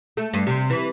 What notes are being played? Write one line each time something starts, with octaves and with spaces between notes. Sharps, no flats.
A3
G2
C3
E3